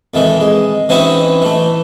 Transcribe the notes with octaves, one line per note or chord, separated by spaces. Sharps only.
F2 D#3 E3 G#3
G#3
E3 C4 C#4 D#4 E4 F#4
E3 A3